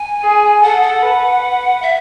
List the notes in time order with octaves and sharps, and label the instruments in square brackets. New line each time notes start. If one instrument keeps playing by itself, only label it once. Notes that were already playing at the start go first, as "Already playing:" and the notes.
Already playing: [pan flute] G#5
[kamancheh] G#4
[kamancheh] A4 [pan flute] F#5
[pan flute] F#5
[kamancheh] B4
[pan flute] E5